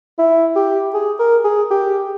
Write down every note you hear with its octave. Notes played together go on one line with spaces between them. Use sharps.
E4
G4
G#4
A#4
G#4
G4